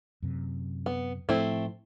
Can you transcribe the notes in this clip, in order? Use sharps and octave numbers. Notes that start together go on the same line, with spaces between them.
F#2 C3
B3
A2 F3 A3 C4 E4